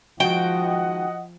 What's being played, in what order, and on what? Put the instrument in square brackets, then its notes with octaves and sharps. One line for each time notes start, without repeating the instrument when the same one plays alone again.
[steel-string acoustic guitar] D#3 G#3 F#4 [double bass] F3 [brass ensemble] D#5 F#5 [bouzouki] G5